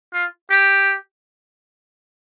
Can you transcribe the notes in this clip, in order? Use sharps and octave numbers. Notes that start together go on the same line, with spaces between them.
F4
G4